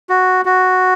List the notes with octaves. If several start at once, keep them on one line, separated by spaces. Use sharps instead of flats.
F#4
F#4